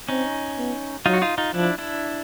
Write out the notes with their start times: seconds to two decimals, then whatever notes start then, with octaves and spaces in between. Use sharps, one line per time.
0.09 C4 C#4 D#4
0.57 B3
1.06 F#3 D#4 F4
1.13 F#4
1.22 D#4 F4
1.38 D#4 F4
1.54 F3 D4 E4
1.78 D4 E4